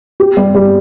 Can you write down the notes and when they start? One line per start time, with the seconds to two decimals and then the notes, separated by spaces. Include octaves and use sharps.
0.20 G4
0.37 G3
0.55 G3